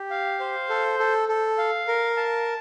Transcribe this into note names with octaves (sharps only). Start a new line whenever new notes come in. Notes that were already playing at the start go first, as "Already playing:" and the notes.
Already playing: G4
F5
C5
A4
A4
A4
F5
A#4
A5